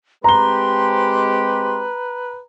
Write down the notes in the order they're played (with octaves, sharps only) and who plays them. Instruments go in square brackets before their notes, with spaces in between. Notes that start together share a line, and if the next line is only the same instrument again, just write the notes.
[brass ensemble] G#3 C4 G4 [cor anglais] B4 [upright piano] A#5 G7 [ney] C6